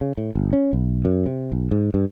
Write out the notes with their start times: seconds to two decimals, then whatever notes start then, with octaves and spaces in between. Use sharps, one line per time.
0.01 C#3
0.17 A2
0.35 G1
0.53 C#4
0.73 B1
1.05 F#2
1.26 C3
1.52 B1
1.71 G#2
1.94 G2